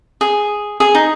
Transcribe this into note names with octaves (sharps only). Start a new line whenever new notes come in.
G#4
G#4
D#4